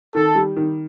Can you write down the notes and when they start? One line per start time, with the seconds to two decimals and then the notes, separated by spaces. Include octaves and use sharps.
0.15 D#3 A4
0.35 G3
0.56 D#3